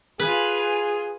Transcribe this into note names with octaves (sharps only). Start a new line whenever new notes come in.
F4 G#4 B4 G#5